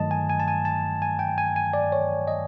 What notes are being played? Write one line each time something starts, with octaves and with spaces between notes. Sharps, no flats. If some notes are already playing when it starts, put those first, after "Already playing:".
Already playing: G2 D#3 F#3 A3 D#5 A5
G#5
G#5
A5
G#5
A5
G#5
G5
G#5
G#5
D5
C#5
D#5